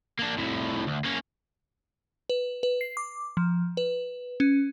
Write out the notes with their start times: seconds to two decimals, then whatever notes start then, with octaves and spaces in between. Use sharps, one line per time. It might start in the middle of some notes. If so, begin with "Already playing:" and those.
0.19 A#3 D4
0.38 C2 A2
0.87 D2
1.05 A#3 C#4
2.29 B4
2.63 B4
2.81 C7
2.97 D6
3.37 F3
3.77 B4
4.40 C#4